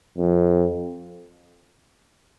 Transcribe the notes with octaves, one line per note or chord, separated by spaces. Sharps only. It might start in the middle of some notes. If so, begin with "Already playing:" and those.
F2